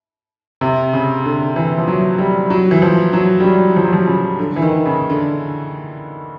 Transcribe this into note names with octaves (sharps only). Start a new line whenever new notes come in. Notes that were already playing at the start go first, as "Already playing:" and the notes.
C3
C#3
D3
E3
F3
F#3
G3
F#3
E3
F3
F#3
G3
F#3
F3
F#3
F3
C#3
D3
E3
D#3
C#3
D3